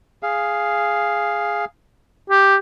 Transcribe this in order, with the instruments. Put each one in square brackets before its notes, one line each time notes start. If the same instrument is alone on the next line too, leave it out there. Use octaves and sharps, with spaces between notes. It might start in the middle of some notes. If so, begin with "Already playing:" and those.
[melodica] G#4 F5
[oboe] G4